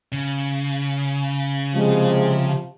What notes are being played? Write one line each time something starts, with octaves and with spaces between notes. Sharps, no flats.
C#3
C3 F3 G#3